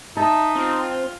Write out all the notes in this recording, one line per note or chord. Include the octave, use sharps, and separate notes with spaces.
D#4 E5 A5
C4 F4